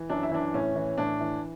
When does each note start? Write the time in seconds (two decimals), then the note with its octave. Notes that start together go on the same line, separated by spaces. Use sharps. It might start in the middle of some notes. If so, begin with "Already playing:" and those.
Already playing: E3
0.09 F#2 D4
0.23 E4
0.31 E3 D4
0.54 A2 C#4
0.75 E3
0.98 A2 D4
1.21 E3